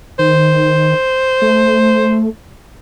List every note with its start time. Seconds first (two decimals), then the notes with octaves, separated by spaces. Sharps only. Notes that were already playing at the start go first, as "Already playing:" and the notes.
0.19 D#3 C5
1.42 A3